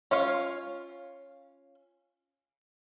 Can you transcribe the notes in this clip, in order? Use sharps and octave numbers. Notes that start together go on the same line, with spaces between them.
C#4 F4 C#5 F5